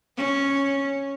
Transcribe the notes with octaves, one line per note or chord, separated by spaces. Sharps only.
C#4